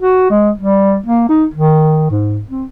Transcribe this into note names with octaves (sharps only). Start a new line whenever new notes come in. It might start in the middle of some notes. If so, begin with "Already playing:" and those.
F#4
G#3
G3
A#3
D#4
D#3
G#2
C4